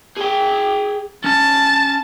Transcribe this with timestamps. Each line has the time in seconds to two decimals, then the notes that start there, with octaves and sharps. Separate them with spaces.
0.17 G#4 G5
1.24 C#4 A5